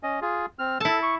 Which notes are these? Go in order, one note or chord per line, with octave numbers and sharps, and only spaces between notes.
C#4 D#5
F4 G#4
C4 F6
E4 A4 A5
C#6